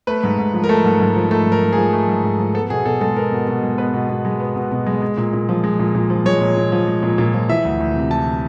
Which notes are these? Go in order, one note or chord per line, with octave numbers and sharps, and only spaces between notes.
A3 B4
G#2
G#2
F3
A#4
A3 A4
G#2
G#2
F3
A3 A4
G#2
A#4
G#2
G#4
F3
A3
G#2
G#2
F3
B3 A4
B2 G#4
B2 A4
G#3 A4
B3 A#4
B2
B2
G#3
B3 B4
B2
B2
G#3
B3
B2
B2
G#3
G#3
A#2
A#2
F3
G#3
A#2
A#2
F3
G#3 C#5
A#2
A#2
F3
G#3
A#2
A#2
F3
E3 E5
D2
D2
C3
E3 A5